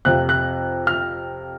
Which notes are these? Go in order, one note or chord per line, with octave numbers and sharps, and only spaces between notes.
F2 C3 F3 F#6
F#6
F6